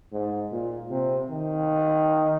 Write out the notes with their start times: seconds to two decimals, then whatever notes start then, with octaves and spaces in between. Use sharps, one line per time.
0.13 G#2
0.52 A#2
0.91 C3
1.30 D#3